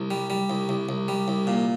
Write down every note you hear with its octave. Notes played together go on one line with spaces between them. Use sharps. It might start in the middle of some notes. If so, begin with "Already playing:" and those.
Already playing: C2
G3
G3
C2
C2
C2
G3
C2
A#2